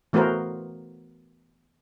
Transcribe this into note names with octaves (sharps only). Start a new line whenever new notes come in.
E3 A3 B3 F#4 A#4 C5